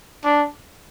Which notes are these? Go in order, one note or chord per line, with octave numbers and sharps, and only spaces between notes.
D4